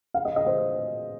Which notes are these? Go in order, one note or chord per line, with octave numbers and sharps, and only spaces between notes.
F5
D#5
D#5
C5